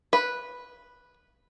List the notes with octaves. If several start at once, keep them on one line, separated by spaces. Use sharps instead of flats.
B4